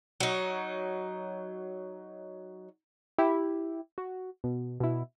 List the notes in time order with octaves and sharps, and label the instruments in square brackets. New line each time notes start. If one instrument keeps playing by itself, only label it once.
[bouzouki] F#3 D#4
[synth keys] E4 G4
F#4
B2
B2 E4